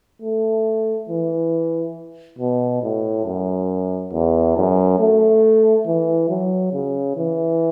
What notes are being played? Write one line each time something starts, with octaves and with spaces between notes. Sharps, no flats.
A3
E3
B2
A2
F#2
E2
F#2
A3
E3
F#3
C#3
E3